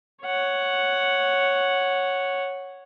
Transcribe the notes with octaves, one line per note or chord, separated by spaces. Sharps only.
C#5 F#5